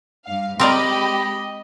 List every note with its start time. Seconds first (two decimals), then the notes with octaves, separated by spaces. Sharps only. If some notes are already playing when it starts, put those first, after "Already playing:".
0.25 G2 F5
0.60 G#3 C4 G4 A#4 D5 D#5 B5